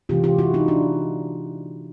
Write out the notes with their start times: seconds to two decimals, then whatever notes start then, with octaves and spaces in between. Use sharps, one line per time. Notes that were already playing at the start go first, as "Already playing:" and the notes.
0.09 C3 E3 G#3 F4 G4
0.24 F4 G4
0.39 E4 F#4
0.54 D#4 F4
0.68 D4 E4